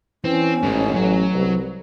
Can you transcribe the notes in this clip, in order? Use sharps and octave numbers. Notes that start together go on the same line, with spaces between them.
E3 C4 C#4
A1 G#2 D#3
A1 F#3
C2 B4